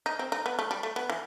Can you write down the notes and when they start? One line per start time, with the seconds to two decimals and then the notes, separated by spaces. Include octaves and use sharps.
0.06 D#4
0.19 C4
0.32 D#4
0.46 B3
0.59 A3
0.71 G3
0.83 A3
0.96 B3
1.10 E3